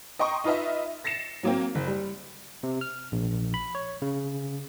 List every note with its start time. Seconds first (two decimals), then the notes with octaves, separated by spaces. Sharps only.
0.19 D#5 G5 A#5 C6 C#6 D#6
0.44 D#4 F4 B4 D#5 E5
1.04 A6 A#6 C7 C#7 E7
1.43 F#3 A#3 C4
1.75 F#1
1.87 G3
2.63 C3
2.81 F6
3.12 A#1
3.54 B5
3.75 C#5
4.02 C#3